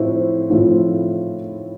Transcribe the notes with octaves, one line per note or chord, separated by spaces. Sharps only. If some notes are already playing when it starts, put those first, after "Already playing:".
Already playing: A2 F3 C4 E4
A2 F3 C4 E4